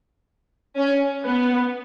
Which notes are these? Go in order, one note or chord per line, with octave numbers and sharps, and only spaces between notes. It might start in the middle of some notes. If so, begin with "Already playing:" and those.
C#4
B3